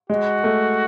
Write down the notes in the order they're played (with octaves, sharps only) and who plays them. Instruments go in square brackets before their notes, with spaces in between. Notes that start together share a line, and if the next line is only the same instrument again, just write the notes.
[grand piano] G#3 [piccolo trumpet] F#4
[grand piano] A3